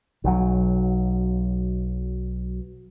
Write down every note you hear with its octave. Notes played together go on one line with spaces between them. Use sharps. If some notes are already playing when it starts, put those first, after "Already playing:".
B1 F#3